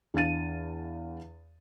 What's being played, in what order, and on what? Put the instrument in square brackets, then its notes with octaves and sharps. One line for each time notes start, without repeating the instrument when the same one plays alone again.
[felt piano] E2 D4 F5 A6 D#7